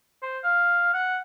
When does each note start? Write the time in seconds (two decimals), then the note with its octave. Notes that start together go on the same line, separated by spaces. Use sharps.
0.22 C5
0.44 F5
0.93 F#5